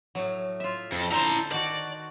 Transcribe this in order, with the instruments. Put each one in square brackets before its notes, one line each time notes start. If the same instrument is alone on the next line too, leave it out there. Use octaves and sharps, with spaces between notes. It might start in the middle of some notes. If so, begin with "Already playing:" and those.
[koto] A2 F#3
F4 E5
[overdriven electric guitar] F2
[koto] D3 C5 A5 [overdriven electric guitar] E4 A#5
[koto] D#3 F#4 [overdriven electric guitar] D5